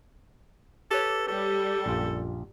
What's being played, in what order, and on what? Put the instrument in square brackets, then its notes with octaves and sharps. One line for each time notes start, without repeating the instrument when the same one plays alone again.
[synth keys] G4 B4 C#5 [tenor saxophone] A4
[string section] G3 [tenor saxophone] A4
[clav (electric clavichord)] A#1 F4 [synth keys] F#2 A#2